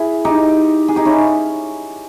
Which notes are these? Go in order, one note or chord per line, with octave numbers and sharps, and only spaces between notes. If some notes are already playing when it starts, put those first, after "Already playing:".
Already playing: E4 G#4
D#4 G4
G#4
D#4 G4
C#4 E4